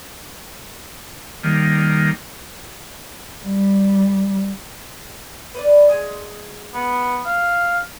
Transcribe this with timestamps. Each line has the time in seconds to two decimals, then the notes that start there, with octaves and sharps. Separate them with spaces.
1.43 D#3 G3 A#3
3.43 G3
5.54 B4 C5 D5
5.90 G#3 G#5
6.75 B3
7.26 F5